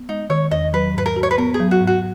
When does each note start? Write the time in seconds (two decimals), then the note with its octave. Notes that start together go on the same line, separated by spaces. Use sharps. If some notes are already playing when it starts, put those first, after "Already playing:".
Already playing: B3
0.09 G#3 D#4
0.30 D#3 C#5
0.51 E2 D#5
0.73 F#3 B4
0.95 G#2 B4
1.06 A#4
1.16 F#4
1.23 C#5
1.31 B4
1.38 B3 A#4
1.54 G#4
1.60 F#3
1.71 F#4
1.82 G#2
1.87 F#4